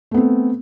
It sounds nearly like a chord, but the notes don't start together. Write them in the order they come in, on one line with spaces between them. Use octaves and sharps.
A3 B3 C4